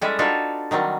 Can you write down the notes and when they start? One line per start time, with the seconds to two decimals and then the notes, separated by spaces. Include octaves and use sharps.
0.01 G3 G#3 C#4 E4 G#4 A4
0.19 D4 D#4 F4 F#4 A4 B4
0.71 D#3 F#3 G3 C4